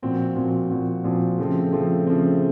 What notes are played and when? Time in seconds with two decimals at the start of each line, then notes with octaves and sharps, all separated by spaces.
0.02 A#2 F3 C4 F#4
0.36 A#2 F3 C4 F#4
0.70 A#2 F3 C4 F#4
1.04 A#2 F3 C4 F#4
1.38 C#3 F3 A3 C4
1.72 C#3 F3 A3 C4
2.07 C#3 F3 A3 C4